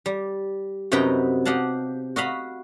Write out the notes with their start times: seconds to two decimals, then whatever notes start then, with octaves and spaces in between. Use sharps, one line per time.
0.06 G3
0.92 F#2 C3 B3 D#4 B4 G5
1.45 G4 D#5 F5 F#5 A5
2.16 F#4 D#5 F5 B5